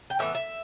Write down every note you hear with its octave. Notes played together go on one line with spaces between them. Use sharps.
G5
A2 E3 B3 E5
E5